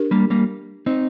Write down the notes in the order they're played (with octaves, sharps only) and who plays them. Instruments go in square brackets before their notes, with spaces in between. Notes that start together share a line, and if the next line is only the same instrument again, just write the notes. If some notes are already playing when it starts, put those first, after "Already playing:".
Already playing: [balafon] D4 G4 A#4
[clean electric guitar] G3 A#3
G3 A#3
C4 D#4